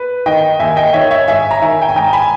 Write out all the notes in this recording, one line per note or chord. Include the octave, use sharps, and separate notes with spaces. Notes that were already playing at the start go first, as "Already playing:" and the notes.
Already playing: B4
D#3 D#5 G5
D#2 E5 G#5
D#5 G5
D#3 C#5 E5
C#5 E5
G#2 E5 G#5
A#5
D#3 E5 G#5
G5
G#5
G#2 G5 A#5
G#5 B5